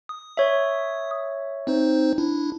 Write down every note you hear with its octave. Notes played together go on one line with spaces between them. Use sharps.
D#6
C#5 E5
C4 D#4 C5
D4 E4